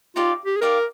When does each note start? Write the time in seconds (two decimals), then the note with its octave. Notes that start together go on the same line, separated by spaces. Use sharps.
0.16 D#4 F4 G4 D5 F5
0.46 G4
0.57 G#4
0.61 D#4 G4 A#4 D5 F5